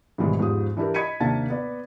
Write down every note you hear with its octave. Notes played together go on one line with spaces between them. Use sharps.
G#2 B2 D#3 E3 G3 G#3
E2 G#2 F3 G4 D#6
E3 D4 E4 G4 A#4
D#5 B5 G#6 B6 C#7 D#7
D#2 C3 A#3 D4 A5 A6
B3 D5